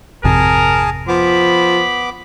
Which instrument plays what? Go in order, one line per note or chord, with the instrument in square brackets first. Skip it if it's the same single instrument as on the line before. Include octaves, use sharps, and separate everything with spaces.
[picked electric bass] G#1 F2 C3 [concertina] G#4 G#5 A5 [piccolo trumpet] A#4
[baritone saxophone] F3 [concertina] B3 D6 [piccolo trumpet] B5